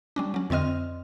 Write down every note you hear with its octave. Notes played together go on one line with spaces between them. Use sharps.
G3 C#4 D4
F#3 C#4
F2 D3 C4 D#5 F6